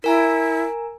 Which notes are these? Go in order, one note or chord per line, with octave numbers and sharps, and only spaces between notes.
E4 A#4 G#5 A#5